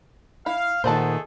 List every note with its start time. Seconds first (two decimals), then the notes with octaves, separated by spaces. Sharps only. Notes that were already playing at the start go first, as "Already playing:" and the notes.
0.46 E4 F5
0.84 A#2 D#3 A3 G#4 A4 C5 F#5 A5